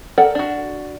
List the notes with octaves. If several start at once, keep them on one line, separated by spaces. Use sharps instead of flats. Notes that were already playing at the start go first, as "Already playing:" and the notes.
A4 A#4 D5 F#5 G5
D4 F#4